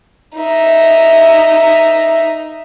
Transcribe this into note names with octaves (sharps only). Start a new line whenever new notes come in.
D#4 E5